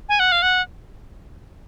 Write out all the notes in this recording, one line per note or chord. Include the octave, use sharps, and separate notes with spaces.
G#5
F#5
F5
F#5